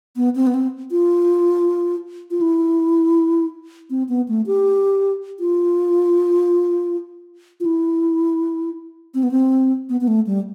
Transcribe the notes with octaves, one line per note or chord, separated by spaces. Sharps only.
B3
C4
B3
C4
F4
F4
E4
C4
B3
A3
G4
F4
F4
E4
C4
B3
C4
B3
B3
A3
G3